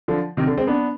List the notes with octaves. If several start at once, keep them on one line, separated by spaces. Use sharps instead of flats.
D3 F3
C3 D#3
D3
G#3 C4
B3 D4